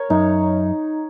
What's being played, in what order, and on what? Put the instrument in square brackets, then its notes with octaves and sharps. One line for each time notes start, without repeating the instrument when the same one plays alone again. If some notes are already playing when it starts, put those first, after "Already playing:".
Already playing: [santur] A#4 C#5
[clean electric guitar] F#2 [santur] D#4